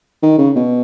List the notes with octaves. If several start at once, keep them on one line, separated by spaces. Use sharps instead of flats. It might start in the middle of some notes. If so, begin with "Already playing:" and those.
D#3
C#3
B2